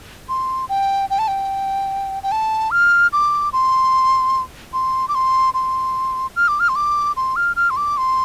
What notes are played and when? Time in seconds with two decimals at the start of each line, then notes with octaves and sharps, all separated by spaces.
0.29 C6
0.69 G5
1.10 G5
1.19 A5
1.28 G5
2.23 G5
2.32 A5
2.71 F6
3.13 D6
3.53 C6
4.73 C6
5.08 D6
5.15 C6
5.54 C6
6.36 F6
6.48 D6
6.60 F6
6.69 C6
6.76 D6
7.17 C6
7.36 F6
7.56 F6
7.70 C6
7.77 D6
7.97 C6